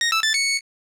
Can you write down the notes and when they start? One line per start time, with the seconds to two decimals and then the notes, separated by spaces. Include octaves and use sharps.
0.01 A#6
0.12 E6
0.23 A6
0.34 C#7